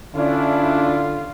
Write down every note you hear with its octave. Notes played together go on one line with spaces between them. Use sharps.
D3 C#4 D4 E4 F4